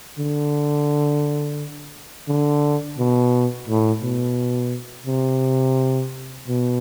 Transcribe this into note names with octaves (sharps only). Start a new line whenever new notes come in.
D3
D3
B2
A2
B2
C3
B2